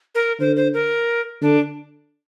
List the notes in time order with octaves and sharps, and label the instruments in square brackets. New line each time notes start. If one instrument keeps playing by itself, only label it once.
[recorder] A#4
[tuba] D3 [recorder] C5
[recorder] C5
A#4
[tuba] D3 [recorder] D4